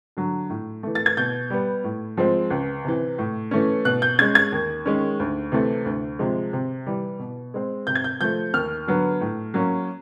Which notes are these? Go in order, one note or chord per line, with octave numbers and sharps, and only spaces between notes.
D3 F#3
A2
E3 A3
A6
G#6
B2 G6
G3 B3
A2
F3 G#3 C4
C#2
C3 E3
A2
E3 A3 C#4
B2 F#6
G6
G#3 C#4 G#6
G#6
D#2
D#3 G#3 C#4
D2
C3 E3 A3
D2
C3 F3 G#3
C3
E3 G3
B2
G#3 C4
C3 G6
G#6
G6
F3 A3 G6
D#2 F6
D3 F#3 B3
A2
F#3 A#3 C#4